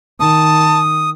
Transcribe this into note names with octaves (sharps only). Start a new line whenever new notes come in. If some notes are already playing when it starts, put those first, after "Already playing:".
D#3 A5 D#6